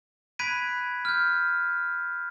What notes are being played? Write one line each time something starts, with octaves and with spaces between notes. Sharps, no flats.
B5 F#6 G#6 B6 D7 D#7
F6 G6